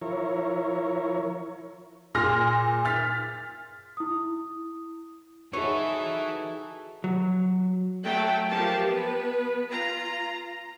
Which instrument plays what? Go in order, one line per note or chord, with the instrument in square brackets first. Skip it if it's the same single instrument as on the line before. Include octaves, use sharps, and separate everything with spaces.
[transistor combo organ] F3 E4 A#4 C#5
[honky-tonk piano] A#2 G#4 C6 F6 A#6
F6 A6 B6
[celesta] E4 D#6
[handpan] D#4 F#4 G#4 [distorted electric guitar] E4 B4 [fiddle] A4 E5 [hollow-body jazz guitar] C#5
[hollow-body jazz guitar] F#3
[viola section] F#3 A3 A4 G5
F3 G4 A#4 A5
B3 B4
F4 A#5